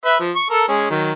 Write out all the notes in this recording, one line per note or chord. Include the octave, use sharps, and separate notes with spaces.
B4 E5
F3
C#6
A4 A#4
G#3 C#4
D#3 F#3